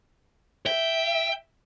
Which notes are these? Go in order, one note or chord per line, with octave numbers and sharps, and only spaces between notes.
E5 G5